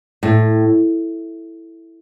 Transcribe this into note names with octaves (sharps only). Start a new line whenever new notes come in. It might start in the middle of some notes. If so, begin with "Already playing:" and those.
A2